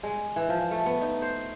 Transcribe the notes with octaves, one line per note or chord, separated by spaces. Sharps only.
G#3
E3
F3
A3
B3
D#4
C5